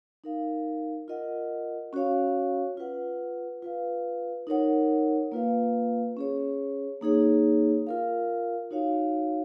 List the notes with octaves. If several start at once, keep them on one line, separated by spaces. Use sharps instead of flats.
D#4 A#4 F5
F4 A#4 D#5 F#5
C#4 F#4 C#5 F5
F4 B4 F#5
F4 B4 F5
D#4 A#4 C#5 F#5
A#3 F4 B4 F5
C#4 G#4 C#5
A#3 D#4 G#4 C#5
F4 A#4 F5
D#4 F#4 C#5 F5